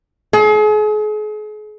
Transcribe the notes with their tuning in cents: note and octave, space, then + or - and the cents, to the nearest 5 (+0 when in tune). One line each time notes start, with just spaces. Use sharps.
G#4 +40